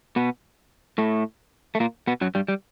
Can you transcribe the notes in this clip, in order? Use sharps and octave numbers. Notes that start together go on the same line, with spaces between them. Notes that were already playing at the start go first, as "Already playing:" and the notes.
B2 B3
A2 A3
A3
A#2 A#3
B2 B3
F#2 F#3
G2 G3
G3